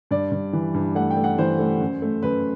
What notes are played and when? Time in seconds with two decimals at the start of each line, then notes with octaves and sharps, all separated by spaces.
0.11 G2 D5
0.31 G2
0.53 E3
0.74 G2
0.95 A3 F#5
1.11 G5
1.17 A3
1.24 F#5
1.38 E3 C5
1.59 A3
1.80 F#2
2.02 A3
2.23 F#2 B4